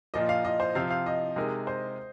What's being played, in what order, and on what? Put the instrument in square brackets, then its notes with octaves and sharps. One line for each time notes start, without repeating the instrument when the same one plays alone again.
[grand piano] A#2 F3 A#3 [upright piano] D#5
[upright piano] F5
D#5
C5
[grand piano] C3 F3 C4 [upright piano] F5
[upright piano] F5
D#5
[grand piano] C3 G#3 D#4 A#4
[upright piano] C5